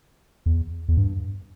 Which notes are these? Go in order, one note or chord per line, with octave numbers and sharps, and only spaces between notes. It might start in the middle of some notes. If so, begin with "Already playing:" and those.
E2
E2
G2